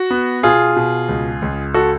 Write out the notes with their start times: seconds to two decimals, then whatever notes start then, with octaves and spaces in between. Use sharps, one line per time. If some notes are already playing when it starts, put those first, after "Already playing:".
Already playing: F#4
0.11 B3
0.43 B2 F4 G#4
0.76 B2
1.09 C#2
1.42 C#2
1.74 F#4 A4